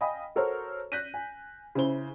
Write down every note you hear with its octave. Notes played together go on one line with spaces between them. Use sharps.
D#5 F5 G5 G#5 B5 D#6
F#4 A4 A#4 C5 C#5
F#6 G6 A#6 B6 D#7
G#5
C#3 E4 C5 G7